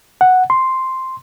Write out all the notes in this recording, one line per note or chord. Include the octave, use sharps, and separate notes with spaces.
F#5
C6